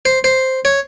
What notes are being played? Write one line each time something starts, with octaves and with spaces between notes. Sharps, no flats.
C5
C5
C#5